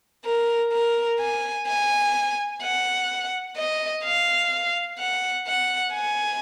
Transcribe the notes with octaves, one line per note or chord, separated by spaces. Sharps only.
A#4
A#4
G#5
G#5
F#5
D#5
F5
F#5
F#5
G#5